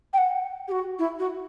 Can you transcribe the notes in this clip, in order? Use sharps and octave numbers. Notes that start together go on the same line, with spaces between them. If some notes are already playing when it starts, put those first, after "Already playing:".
G5
F#5
G4
F#4
E4
F#4